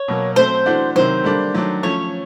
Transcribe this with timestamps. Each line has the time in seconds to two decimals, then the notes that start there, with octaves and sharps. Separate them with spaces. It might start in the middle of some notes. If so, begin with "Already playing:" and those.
Already playing: C#5
0.08 B2 F#3 A#3
0.36 F#3 A3 C4 C5
0.66 E3 A3 D4 F#4
0.96 C3 D#3 F#3 C5
1.24 D3 G3 A#3 D4
1.54 D#3 F#3 A3 D4
1.83 F3 A3 C#4 C#5